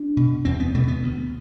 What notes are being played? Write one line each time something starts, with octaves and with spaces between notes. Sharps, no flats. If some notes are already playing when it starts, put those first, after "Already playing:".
Already playing: D4
B2
E2 C4
B3
B2 A3
B3
D2